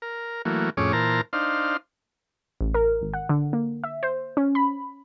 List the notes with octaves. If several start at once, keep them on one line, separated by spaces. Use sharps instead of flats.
A#4
E3 F#3 A3 A#3
F2 A2 C#4 G#4 C#5 D6
A#2 E3 A#4 C5 A5 A#5
D4 D#4 C5 F5
A1
A#4
G#1
F#5
D3
A#3
E5
C5
C#4
B5